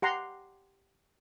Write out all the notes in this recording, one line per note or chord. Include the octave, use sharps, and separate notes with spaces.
G4 F#5 A#5 C6